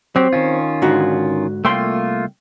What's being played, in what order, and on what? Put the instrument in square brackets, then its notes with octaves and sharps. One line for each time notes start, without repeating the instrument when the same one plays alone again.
[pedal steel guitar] F#3 G4 [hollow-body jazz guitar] C4
[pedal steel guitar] D#3 C#4 F4
[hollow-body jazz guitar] G#2 D3 F#4
[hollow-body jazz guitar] C2 G5 C6 [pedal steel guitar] A3 A#3 F4